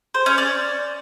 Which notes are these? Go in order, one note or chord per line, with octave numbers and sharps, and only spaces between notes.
C5
C#4
D5